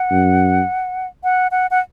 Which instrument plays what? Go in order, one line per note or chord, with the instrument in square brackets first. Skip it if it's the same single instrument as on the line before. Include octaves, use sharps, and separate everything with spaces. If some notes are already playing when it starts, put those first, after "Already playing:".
Already playing: [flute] F#5
[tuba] F#2
[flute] F#5
F#5
F#5